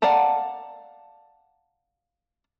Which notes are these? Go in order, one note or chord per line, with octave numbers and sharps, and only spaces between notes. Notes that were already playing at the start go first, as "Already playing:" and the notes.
D5 F5 F#5 A5 A#5